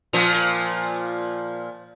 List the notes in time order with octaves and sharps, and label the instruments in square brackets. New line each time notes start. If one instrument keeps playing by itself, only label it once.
[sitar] A#2 F3